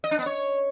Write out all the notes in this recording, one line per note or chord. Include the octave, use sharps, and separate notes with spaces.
D#5
D4
B3
C#5